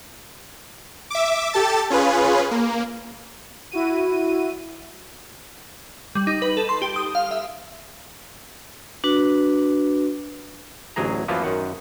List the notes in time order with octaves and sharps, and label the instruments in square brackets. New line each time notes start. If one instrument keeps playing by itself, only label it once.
[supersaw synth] E5 D6
G4 A4 A5 A6
C#4 F4 G#4 B4
A#3
[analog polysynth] E4 F#4 D#7
[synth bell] G3
D#4
B4
A4
C6
G4
D#6
F5
E5
[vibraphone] D4 F#4 B4
[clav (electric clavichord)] A1 D2 F#3 G#4 A#5
F#2 E3 F3 A#3 B3 F4
F#2 D#3 F#5